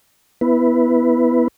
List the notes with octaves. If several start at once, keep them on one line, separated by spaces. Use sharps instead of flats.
B3 E4 B4